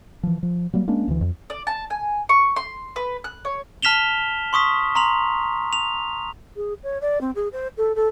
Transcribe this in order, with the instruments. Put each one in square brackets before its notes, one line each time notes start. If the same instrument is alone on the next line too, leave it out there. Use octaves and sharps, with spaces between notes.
[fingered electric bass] E3 F3
F3
F#3 G3 A#3
G#3 A#3 C#4 D4
D2 E3
F2
[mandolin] D5
A5
G#5
C#6
C6
B4
F#6
C#5
[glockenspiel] A5 F6 B6 E7 F7 G7
C6 C#6 D#6 B6
A#5 C6 F7
F7
[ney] G#4
C#5
D5
C4
G#4
C5
A4
A4